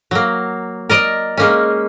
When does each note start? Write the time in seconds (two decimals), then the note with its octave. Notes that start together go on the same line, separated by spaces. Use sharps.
0.11 F#3 A#3
0.89 A#4 D5 D#5
1.37 G#3 A#3 C#4